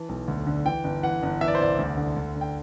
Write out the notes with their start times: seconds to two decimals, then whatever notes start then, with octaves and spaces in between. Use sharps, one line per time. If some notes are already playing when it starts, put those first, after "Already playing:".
Already playing: E3 A5
0.09 B1
0.28 D2
0.47 D3
0.65 E3 G5
0.84 G1
1.03 E3 F#5
1.23 G1
1.41 E3 E5
1.48 D5
1.55 C5
1.59 C2 D5
1.78 D2
1.97 D3
2.16 D2
2.35 D3
2.41 G5